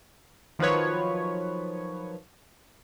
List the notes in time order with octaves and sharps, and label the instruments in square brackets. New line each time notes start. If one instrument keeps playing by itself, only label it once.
[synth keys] D#3 F3 F#3 B4 C#5